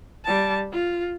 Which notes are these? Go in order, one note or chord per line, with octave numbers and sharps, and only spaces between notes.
G3 A5
F4